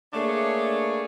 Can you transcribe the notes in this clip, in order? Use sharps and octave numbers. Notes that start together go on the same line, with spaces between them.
A3 A#3 D4 G#4 C#5